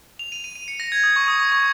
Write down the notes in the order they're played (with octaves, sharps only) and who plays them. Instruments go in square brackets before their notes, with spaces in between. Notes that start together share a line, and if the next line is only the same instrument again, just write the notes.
[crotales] F7
D#7
D#7
D#7
C#7
A#6
G#6
D#6
C#6
D#6
C#6
C#6